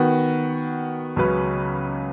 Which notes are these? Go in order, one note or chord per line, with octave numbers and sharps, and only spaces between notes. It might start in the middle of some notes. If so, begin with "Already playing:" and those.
Already playing: D#3 B3 F#4
C#2 C#3 F#3 C#4 B4